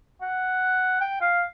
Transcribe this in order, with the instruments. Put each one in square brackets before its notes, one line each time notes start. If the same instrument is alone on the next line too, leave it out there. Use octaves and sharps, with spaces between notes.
[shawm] F#5
G5
F5